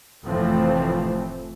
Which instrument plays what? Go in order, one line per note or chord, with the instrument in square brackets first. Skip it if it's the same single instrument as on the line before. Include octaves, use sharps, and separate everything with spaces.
[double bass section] F1 A2 E3 F3 A3 C4